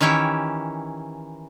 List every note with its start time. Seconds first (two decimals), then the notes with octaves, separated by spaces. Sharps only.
0.01 D#3 E3 C#4 E4 G4